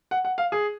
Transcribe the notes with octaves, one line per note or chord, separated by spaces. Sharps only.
F#5
F#5
F5
G#4